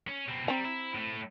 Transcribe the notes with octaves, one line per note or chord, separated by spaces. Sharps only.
C#4
B2 C4
G3 C4 A#5
E4
A2 A3